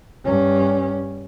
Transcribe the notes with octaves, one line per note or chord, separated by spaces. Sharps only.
G2 C#4